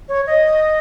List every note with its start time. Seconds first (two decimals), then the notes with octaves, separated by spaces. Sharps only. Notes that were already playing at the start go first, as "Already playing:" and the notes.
0.09 C#5
0.27 D#5